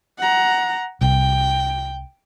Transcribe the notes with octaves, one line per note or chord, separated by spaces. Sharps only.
F#5 A#5
C2 G5